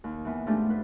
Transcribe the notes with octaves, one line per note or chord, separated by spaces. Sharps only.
D#2
E3 A#3 B3 E4
G#2 F3 A3 B3 D4 G4
B4 C5